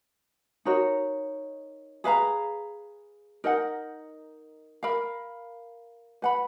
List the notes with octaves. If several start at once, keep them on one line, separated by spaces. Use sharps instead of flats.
D#4 F#4 A#4 C#5
G#4 B4 F5 A#5
D#4 A#4 D#5 F#5
A#4 F5 B5
B4 F#5 B5